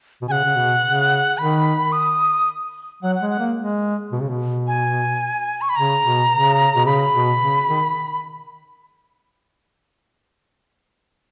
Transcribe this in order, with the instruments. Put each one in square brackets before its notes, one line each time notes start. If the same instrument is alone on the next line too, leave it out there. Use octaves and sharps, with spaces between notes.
[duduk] B2
[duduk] C#3 [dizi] F#5 G#5
[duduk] C#3
B2
C#3
[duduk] D#3 [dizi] B5
[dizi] D#6
[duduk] F#3 [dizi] F#5
[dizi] F#5
[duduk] G#3
[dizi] F#5
[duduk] A#3
G#3
B2
C#3
B2
[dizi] G#5
C#6
B5
[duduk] C#3 [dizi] A#5
[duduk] B2
C#3
B2
[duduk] C#3 [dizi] B5
[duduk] B2
C#3
D#3